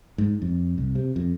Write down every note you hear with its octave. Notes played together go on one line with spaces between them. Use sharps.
G#2
F2
C2
C3
F2